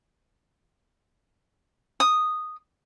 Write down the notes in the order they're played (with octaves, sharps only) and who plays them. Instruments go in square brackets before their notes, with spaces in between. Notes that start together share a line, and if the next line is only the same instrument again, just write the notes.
[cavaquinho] D#6